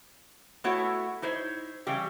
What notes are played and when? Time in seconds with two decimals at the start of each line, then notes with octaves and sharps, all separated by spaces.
0.64 A3 B3 E4 F#4 A4 C#5
1.22 D#4 E4 C5 C#5
1.86 C#3 E3 G3 G4